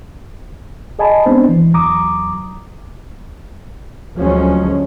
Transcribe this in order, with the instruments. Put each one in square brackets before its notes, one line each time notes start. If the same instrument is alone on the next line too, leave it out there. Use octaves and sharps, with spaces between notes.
[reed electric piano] G#4 D#5 G#5 A5 B5
G#3 B3 C4 D4 C5
E3
E2 F#3 A#5 D6 D#6
[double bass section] D2 F3 F#3 G#3 C#4